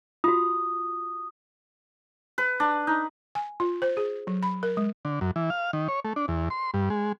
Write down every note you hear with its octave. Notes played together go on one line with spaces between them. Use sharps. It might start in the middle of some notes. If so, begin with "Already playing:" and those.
F4 F#4 D#6
B4
D4
D#4
G#5
F4
C5
G#4
F#3
B5
A#4
G#3
D3
F#2
E3
F5
D#3
C#5
A3
D4
E2
C6
G2
G#3